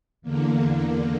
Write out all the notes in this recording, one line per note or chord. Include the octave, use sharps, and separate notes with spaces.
E2 D3 A#3